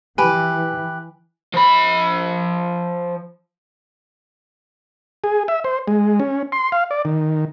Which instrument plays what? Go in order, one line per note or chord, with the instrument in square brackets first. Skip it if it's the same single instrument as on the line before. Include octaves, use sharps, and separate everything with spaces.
[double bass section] E3 [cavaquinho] G4 B4 [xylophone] G#5
[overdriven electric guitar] F3 B5
[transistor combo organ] G#4
E5
C5
G#3
C#4
C6
F5
D5
D#3